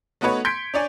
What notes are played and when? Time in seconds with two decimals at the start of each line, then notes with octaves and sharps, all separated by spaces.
0.21 A3 B3 D#4 F#4 B4 C#5
0.45 C6 G6 G#6 B6 C#7 D7
0.74 D4 C#5 D5 G#5